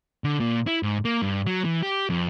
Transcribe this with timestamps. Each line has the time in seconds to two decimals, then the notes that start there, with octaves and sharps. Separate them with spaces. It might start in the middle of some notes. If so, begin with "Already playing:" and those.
0.24 D3
0.40 A#2
0.67 E4
0.83 G#2
1.05 A#3
1.22 G2
1.47 F#3
1.65 E3
1.83 G4
2.10 F2